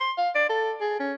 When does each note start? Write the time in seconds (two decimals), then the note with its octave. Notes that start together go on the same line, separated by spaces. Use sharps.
0.01 C6
0.18 F5
0.35 D5
0.50 A4
0.81 G#4
1.00 C#4